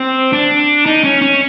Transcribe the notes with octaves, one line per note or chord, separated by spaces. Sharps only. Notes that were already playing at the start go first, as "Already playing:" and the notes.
Already playing: C4
D4
D#4
C#4
C#4